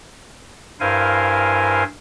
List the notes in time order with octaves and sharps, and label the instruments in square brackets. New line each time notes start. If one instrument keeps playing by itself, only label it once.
[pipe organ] G2 E4 A#4 C5 F5 G#5